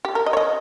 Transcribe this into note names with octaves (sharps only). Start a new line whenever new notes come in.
G4
A#4
D#5
C#5
D#5